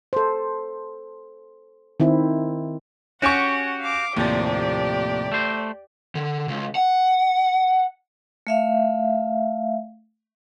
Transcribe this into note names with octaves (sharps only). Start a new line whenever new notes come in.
A4 C5
D#3 C4 E4
C#4 F#4 G4 F#5 G#5 C#6
F5 D6
D#2 A2 C3 F3 G4 D5
A3 C5
D3
C#2
F#5
A3 E5 F5